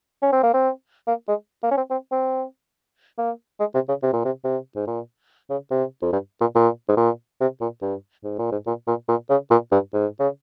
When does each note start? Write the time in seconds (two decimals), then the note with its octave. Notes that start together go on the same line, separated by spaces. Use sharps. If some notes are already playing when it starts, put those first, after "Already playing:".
0.22 C#4
0.32 C4
0.43 A#3
0.54 C4
1.07 A#3
1.28 G#3
1.63 A#3
1.71 C#4
1.77 C4
1.91 C4
2.12 C4
3.18 A#3
3.60 G#3
3.74 C3
3.89 C#3
4.03 C3
4.13 A#2
4.25 C3
4.45 C3
4.76 G#2
4.87 A#2
5.50 C#3
5.71 C3
6.02 F2
6.13 G2
6.41 A#2
6.55 A#2
6.89 G#2
6.97 A#2
7.41 C3
7.61 A#2
7.82 G2
8.24 G#2
8.38 A#2
8.52 G#2
8.67 A#2
8.87 A#2
9.09 A#2
9.30 C#3
9.51 A#2
9.72 G2
9.94 G#2
10.20 C#3